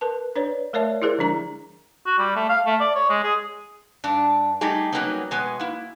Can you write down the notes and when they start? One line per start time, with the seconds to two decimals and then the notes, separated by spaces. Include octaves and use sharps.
0.01 A#4 B4 A5
0.36 D4 B4 C#5 D5
0.73 A3 A#4 C#5 D5 E5 A5
1.02 E4 G4 G#4 A#4 C5 D5
1.18 D3 F3 G#3 D4 A#5
2.06 F#4
2.18 G3
2.36 A3
2.49 F5
2.66 A3
2.80 D5
2.95 C#5
3.09 G#3
3.23 G#4
4.04 G2 D4
4.61 G3 A3 D#4 G4 G#4
4.92 F#3 G3 A#3 B3 C#4 D#4
5.31 B2 G#3 B3 G#5
5.60 A#3 E4